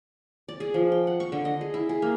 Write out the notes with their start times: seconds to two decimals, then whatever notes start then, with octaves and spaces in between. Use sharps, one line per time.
0.49 D5
0.60 G#4
0.74 F3
0.92 G5
1.07 F#5
1.20 C#6
1.32 D3
1.45 D#5
1.61 G#4
1.74 E4
1.89 G#4
2.02 A#3